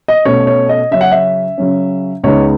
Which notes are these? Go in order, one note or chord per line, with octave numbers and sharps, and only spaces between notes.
D#5
B2 A3 C#4 C#5
C#5
D#5
C#3 F#3 C#4 E5
F#5
E5
C#3 F#3 C#4
C#2 C#3 G#3 B3 D#4 C#5